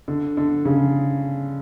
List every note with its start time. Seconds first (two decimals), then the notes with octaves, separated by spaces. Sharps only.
0.08 D3
0.37 D3
0.65 C#3